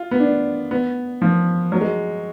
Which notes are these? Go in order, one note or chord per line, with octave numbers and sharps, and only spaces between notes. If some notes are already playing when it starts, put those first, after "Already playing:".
Already playing: F4
B3
D4
B3
F3
F#3
G#3